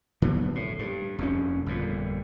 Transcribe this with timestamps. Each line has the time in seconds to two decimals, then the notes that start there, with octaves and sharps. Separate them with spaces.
0.22 D3 F#3 B3
0.55 A2
0.79 G2
1.18 F1 F2 A#2 C#4
1.66 G1 F2 A#2